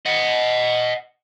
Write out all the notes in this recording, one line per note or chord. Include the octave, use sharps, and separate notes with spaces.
D#5 F#5